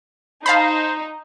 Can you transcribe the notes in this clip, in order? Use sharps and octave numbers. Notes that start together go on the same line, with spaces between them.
D#4 C5 F5 A5 B5